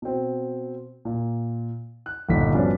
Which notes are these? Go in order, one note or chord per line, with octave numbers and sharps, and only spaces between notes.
B2 C4
A#2
F#6
G1 A#2 D#3 D#4 B6
G2 B2 F3 B3 C#4 D4